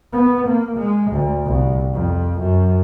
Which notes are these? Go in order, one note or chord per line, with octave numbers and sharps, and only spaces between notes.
B3
A#3
G#3
D2
C2
F2
F#2